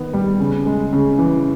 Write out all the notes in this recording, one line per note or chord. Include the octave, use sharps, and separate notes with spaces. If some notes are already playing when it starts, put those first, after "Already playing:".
Already playing: D#3 B3
G3
C#3
G#3
C#3
E3